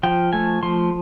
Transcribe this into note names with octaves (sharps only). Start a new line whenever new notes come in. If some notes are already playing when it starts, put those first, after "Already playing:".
F3 G5
A3 G#5
F3 C6